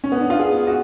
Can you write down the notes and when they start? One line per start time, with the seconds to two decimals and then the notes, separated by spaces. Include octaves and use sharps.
0.04 C#4
0.12 B3
0.21 D4
0.30 F4
0.39 G#4
0.67 F#4